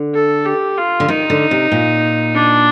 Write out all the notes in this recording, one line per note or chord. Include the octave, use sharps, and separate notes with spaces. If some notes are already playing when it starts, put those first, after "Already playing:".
Already playing: D3
A4
G4
F4
D3
D#3 D#4
D3
C3
A#2
D4